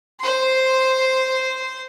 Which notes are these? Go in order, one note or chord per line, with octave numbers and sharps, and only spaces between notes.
C5 C6